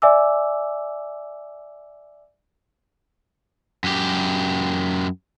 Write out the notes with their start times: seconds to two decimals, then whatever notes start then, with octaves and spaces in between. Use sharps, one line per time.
0.02 D5 E5 G#5 D6 E6
3.84 F#2 G4